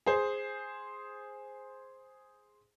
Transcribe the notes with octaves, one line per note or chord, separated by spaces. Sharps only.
G#4 C5